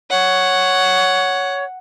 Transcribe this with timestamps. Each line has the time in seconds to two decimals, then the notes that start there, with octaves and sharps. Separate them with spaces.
0.11 C#5 F#5